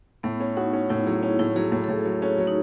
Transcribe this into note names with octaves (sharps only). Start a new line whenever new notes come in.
A2 B3
C#4
D#4 F#4
C#4
A2 E4
F#3 G#4
C#4
A2 E4
F#3 G#4
A2
A4
A2 G#4
F#3
C#4 F#4
F#3
D#4